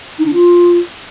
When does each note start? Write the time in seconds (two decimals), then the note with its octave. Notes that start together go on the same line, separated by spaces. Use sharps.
0.19 D#4
0.26 D4
0.33 F4